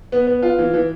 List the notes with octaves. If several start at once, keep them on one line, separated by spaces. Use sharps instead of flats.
B3
B3
F4
E3
E3